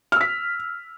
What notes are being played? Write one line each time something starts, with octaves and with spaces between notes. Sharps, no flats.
E6 F6 B6